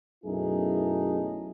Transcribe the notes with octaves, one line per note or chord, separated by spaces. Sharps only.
B1 F#2 A3 D#4 E4 G#4